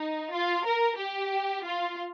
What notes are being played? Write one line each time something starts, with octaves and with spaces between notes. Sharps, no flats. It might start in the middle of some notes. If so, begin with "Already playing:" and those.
Already playing: D#4
F4
A#4
G4
F4